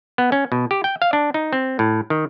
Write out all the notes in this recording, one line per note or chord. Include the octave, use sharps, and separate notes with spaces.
B3
C#4
B2
G4
G5
F5
D4
D#4
C4
A2
D#3